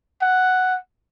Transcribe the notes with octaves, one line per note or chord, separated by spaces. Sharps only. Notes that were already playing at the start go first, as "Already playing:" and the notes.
F#5